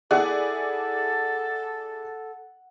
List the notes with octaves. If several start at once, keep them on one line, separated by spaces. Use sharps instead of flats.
E4 G#4 A4 D5 F#5